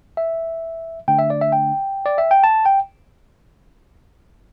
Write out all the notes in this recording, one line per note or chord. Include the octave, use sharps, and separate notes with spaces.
E5
D3 A3 D4 G5
E5
D5
E5
G5
D5
E5
G5
A5
G5